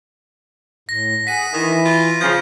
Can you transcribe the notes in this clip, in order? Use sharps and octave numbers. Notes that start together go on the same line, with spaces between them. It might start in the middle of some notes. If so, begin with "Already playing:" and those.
A2 A#6
G#4 F#5 B6 D#7
D#3 E3 E4
F4
C#3 F3 G6